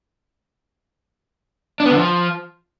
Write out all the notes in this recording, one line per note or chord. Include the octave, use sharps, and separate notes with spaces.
D4
B3
D3
F3